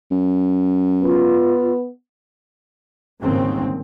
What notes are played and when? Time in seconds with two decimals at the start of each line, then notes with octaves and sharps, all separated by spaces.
0.11 F#2
1.03 B3 F4
3.21 G1 D#2 G#2 C#3 C4